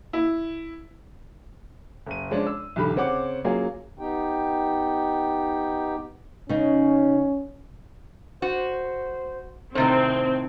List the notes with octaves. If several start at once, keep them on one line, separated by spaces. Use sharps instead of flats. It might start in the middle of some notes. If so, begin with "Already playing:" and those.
E4
F#1 D#7
F3 G#3 C#4 D4
E6
B1 E2 D3 G4 B5
C#3 C4 C#4 F#5 D6
F#3 A#3 C#4 F4 G#4
B3 D#4 G4 G5
C#3 C#4 D#4
F#4 C5
A2 C3 D#3 C4 C5